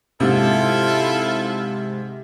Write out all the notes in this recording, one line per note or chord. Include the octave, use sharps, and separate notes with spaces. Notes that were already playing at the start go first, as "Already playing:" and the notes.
G#2 C3 E4 F4 A4